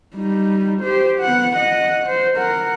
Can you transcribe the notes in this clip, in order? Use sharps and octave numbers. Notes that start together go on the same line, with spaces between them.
G3 D#4
G4 C5
B3 F#5
D#5 F#5
C5
A#4 F#5